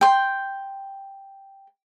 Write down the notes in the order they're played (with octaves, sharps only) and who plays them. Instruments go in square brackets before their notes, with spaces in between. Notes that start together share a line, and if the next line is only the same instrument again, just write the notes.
[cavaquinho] G5 C6